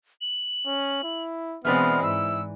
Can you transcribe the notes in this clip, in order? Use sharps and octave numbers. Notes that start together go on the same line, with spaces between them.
F#7
C#4
E4
B2 E3 G#3 B3 C4 B4 D5 F6
G#2 E4 E6